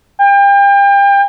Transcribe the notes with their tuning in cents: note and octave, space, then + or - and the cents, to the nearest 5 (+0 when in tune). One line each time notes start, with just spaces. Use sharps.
G5 +35